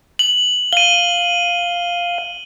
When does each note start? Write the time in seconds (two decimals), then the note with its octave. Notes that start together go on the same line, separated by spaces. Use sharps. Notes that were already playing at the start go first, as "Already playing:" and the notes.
0.19 F#7
0.73 F5 D#7 G7